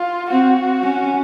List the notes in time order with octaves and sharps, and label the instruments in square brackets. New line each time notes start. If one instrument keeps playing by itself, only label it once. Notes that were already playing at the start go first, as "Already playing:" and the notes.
Already playing: [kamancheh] F4
[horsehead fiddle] C4 [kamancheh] F#4
[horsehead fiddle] C#4